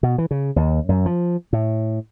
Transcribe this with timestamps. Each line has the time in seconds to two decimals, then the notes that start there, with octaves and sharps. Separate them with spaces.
0.03 B2
0.18 E3
0.31 C#3
0.56 D#2
0.89 F#2
1.06 F3
1.53 A2